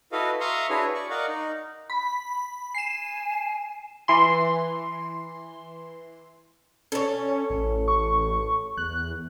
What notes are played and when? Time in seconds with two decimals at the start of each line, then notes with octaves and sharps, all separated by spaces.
0.12 E4 F#4 A4 B4 D#5 F5
0.40 E5 F5 A#5 C6 C#6 D#6
0.70 D4 E4 F#4 G#4 B4 C#5
0.94 D5 C#6
1.10 A#4 D5 D#5 F5 F#5 C#6
1.28 D#4
1.90 B5
2.75 G#5 C7 E7
4.08 E3 C6
6.92 C#4 A4 C#5
7.50 A1
7.88 C#6
8.77 E2 F#6